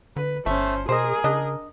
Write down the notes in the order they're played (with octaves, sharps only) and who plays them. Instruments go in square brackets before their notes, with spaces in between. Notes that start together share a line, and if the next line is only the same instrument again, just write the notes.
[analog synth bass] D3 [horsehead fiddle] B4
[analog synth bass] G1 [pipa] A3 [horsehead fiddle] C#4 C5
[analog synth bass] B2 [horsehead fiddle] G#4 A#4 [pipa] C5 D#5
[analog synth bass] C#3 [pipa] D4 D#5